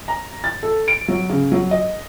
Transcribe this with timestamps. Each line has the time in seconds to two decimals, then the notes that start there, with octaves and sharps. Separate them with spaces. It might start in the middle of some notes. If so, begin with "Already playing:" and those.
0.08 A#5
0.44 A6
0.63 A4
0.88 D7
1.08 F#3
1.30 C#3
1.52 F#3
1.71 D#5